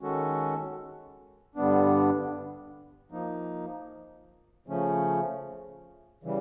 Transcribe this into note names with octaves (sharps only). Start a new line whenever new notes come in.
D#3 G#3 C#4 F#4 A4
G2 D3 G3 B3 D4
F3 A#3 D#4
C#3 F3 A3 C#4
C#3 E3 G3